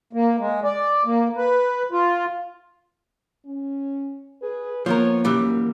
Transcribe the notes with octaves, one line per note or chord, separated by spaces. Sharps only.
A#3
G#3
D5
A#3
B4
F4
C#4
G#4 B4
F3 A#3 B3 A#4 C#5
F#2 E3 G3